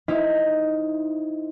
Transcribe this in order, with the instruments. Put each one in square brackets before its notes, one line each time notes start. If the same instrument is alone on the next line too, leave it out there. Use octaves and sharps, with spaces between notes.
[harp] D#4 E4 C5 F5 F6 B6